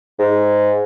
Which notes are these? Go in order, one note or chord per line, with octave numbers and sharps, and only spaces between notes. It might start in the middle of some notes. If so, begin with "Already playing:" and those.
G#2